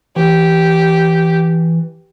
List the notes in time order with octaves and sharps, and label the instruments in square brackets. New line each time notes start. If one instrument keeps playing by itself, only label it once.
[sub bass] E3 [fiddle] G4